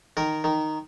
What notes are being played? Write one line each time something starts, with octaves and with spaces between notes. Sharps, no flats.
D#3 A#4
D#3